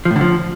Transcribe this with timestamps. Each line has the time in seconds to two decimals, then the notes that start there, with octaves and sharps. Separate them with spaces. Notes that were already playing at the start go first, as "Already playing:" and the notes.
0.05 F3
0.11 A2
0.16 D3
0.21 F3